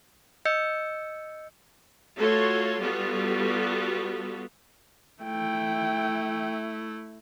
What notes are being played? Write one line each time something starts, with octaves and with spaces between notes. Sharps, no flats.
D#5 E6 G6 C#7
A3 F4 F#4 A4 C#5 C6
G3 B3 F4 F#4 A4
A3 E4 G5